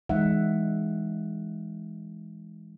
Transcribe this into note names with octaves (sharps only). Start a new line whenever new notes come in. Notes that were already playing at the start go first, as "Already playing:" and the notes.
E3 G#3 D#4 E5 F#5